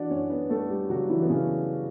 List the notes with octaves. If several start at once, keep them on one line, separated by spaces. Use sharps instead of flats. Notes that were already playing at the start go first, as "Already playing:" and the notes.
Already playing: E3 D4 F#4 D5 F#5
F#2 C#4 C#5
B3 B4
G3 A3 A4
G3 G4
C#3 F#3 F#4
E3 E4
B3
C#3 E3 C#4